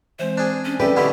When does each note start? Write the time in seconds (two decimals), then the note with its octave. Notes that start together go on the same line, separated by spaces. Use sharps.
0.19 E3 G#3 C4 C5
0.37 D4 G#4
0.65 C#4
0.80 C#4 G4 A4 B4 D5 E5 G5
0.96 B2 D3 E4 G4